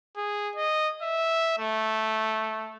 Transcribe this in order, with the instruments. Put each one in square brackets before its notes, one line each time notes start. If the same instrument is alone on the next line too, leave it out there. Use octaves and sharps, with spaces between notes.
[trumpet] G#4
D#5
E5
A3